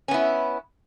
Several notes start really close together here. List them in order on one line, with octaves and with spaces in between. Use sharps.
C#4 B3 E4